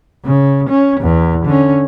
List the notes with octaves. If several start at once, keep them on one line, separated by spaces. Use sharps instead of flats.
C#3
C#4
E2
D3 C#4